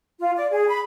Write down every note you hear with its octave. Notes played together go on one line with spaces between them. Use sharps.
F4
D5
G#4
B5